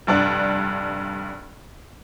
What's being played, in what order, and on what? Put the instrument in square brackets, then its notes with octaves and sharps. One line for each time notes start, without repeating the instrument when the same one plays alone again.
[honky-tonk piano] F1 G2 D4